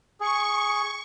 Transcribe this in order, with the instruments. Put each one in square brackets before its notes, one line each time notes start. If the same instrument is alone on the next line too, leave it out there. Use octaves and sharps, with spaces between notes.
[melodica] G#4 [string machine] C#6